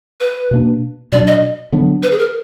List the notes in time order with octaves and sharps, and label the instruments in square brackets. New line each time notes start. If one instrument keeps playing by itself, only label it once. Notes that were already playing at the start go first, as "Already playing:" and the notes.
[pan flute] B4
[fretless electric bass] B2 A#3 D4
[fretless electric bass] B2 F#3 D4 [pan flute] D5
[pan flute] D#5
[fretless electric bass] D3 F#3 B3 D4
[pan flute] B4
G#4
A#4